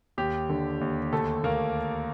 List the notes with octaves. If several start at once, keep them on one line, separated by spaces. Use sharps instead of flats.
D#2 G4
D3
D#2
D2 A3 A4
D2 A#3 A#4